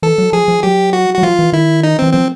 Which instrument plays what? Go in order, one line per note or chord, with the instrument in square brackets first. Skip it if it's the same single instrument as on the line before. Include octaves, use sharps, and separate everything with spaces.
[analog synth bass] E3 [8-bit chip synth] A4
[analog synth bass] F#3
[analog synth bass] F3 [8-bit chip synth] G#4
[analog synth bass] F3
[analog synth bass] F#3 [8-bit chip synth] G4
[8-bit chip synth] F#4
[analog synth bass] F#3 [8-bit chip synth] F#4
[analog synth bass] F3 [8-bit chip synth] F4
[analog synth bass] E3
[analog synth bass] D#3 [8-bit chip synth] E4
[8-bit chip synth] D#4
[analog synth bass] E3 [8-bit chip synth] C4
[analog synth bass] F3 [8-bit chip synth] C4